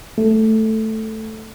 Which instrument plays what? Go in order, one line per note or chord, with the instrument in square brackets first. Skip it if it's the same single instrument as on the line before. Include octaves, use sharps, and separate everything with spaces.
[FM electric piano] A3